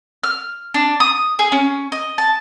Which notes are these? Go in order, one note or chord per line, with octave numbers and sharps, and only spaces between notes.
F6
D4
D#6
G#4
C#4
D#5
A5